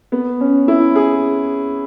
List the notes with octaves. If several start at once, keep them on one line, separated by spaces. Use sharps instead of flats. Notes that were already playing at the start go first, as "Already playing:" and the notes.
B3
C#4
E4
G#4